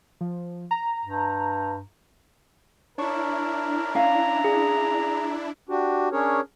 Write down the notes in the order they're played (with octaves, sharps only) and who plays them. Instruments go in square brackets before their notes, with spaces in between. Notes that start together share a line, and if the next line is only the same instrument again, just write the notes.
[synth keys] F3
A#5
[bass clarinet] G2
[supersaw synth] D4 E4 [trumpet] A#4 [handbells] C#5 A5 C#6
[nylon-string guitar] C#4 F5 [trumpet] A#5
[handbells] G#4
[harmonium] D4 F#4 G4
C#4 D4 G#4 A#4 C#5